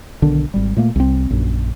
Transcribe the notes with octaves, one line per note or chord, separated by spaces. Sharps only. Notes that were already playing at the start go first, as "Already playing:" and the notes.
B1 D3 D#3 D4
G#1 G3
A#2 A3 A#3
C2 C4
A#1 F#2